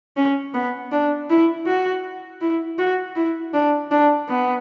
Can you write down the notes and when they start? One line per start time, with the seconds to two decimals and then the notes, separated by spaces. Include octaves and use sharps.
0.17 C#4
0.54 B3
0.92 D4
1.29 E4
1.67 F#4
2.41 E4
2.79 F#4
3.16 E4
3.53 D4
3.91 D4
4.29 B3